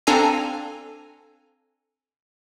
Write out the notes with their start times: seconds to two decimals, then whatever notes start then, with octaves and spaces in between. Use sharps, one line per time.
0.07 C4 D4 A4 F5 G#5 A#5